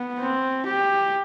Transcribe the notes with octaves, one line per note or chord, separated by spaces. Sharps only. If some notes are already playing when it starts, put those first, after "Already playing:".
Already playing: B3
C4
G4